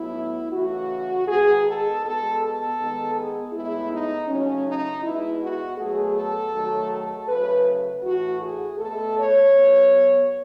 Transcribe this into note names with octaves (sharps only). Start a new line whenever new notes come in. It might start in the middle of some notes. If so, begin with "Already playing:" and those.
Already playing: A2 F#3 B3 E4
C#3 E3 A3 F#4
D#3 G#3 B3 G#4
A4
B2 G#3 B3 A4
A4
D#3 G#3 B3
G#4
A2 G#3 B3 E4
D#4
C#3 F#3 A3 C#4
D#4
B2 G#3 B3 E4
F#4
B2 F#3 A3 G#4
A4
D#3 F#3 A3
A4
C#3 F#3 A3 B4
A2 E3 A3 F#4
G#4
B2 A3 A4
C#5
B2 F#3 B3